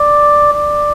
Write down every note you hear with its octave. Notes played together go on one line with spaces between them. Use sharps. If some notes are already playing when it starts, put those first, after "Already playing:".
Already playing: D5
D5